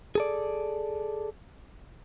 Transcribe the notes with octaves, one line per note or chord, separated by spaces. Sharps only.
G#4 A4 D5